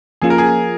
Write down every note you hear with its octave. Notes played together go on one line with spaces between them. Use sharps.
F3 A#3 C#4 F4 G#4
A#4
G#4